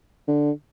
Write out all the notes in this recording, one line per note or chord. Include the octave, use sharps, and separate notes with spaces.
D3